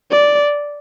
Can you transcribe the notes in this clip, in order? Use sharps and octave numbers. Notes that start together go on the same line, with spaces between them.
D5